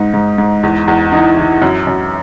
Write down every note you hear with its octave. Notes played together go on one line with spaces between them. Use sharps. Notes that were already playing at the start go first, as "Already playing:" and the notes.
Already playing: G#2 D#4
G#2
G#2
E2
E2
E3 D#4
E3
F#2
F#2